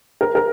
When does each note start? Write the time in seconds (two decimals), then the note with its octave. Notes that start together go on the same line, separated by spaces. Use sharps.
0.21 A#4
0.35 A#4